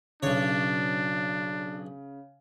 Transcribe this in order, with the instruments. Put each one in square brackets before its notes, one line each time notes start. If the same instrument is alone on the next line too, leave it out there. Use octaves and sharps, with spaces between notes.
[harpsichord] B1 C#5 [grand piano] C#3 [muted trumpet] D4